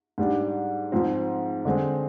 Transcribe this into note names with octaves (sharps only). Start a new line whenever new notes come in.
G#2 G3 D4
G#2 F3 C4
D3 G#3 C4